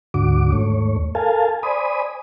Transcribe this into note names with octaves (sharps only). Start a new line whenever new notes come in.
D2 G#2 D3 F#4 D6
D#2 G#2 A3 C#5
A4 A#4 F5 G#5 A5
C5 D5 G#5 B5 D#6